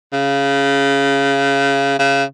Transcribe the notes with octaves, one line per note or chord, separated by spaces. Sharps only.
C#3
C#3